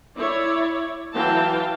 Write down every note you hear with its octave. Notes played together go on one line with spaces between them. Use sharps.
E4 C#5 D5
E3 F#3 F5 G5 A5